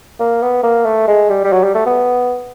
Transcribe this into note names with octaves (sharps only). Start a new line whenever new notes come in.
A#3
B3
A#3
A3
G#3
G3
G3
F#3
G3
A3
B3